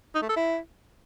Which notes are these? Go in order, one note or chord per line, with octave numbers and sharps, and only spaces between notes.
D#4
A3
A4
E4